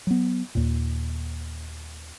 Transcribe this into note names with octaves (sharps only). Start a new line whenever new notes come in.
F#3 B3
D#2 A#2